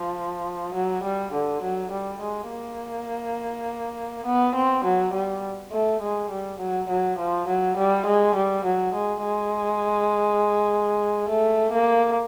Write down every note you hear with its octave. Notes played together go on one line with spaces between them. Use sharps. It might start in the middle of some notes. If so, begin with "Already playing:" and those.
Already playing: F3
F#3
G3
D3
F#3
G3
G#3
A#3
B3
C4
F#3
G3
A3
G#3
G3
F#3
F#3
F3
F#3
G3
G#3
G3
F#3
G#3
G#3
A3
A#3